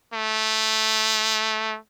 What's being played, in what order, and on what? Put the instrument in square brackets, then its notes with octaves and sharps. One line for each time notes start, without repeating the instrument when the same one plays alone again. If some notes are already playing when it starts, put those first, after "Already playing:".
[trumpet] A3